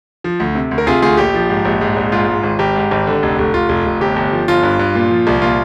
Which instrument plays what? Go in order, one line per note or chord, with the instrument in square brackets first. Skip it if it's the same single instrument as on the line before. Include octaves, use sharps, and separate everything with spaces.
[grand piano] F3
D2
C3
D2
A#4
C3 F4 G#4
D2 F4 G#4
A#1 G4
F3
G#2
A#1
G#2
A#1
G#2 F4
G#2
G#1
G#1 G4
G#2
G#1
D3
F1
F1
F1 F4
F1
F1
G1 G4
G1
F3
G1 F4
G2
G2
A#2
F3
C2
A#2 F4